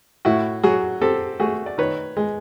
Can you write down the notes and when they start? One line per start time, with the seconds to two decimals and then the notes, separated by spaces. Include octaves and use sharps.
0.25 A2 E4 F#4
0.63 F#3 F#4 G#4
1.01 C4 G4 A4
1.40 A3 F#4 G#4
1.66 D5
1.78 D#3 B4 C#5
2.17 G#3